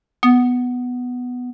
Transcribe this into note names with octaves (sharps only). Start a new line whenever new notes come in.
B3